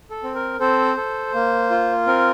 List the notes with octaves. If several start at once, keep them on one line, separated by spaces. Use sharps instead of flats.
A4
C4
A#4
C4 A4 C5
A4
A#3
F4
C4 A#4